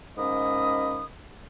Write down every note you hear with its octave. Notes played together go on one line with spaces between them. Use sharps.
G#2 A#3 C#4 D#5 B5 D#6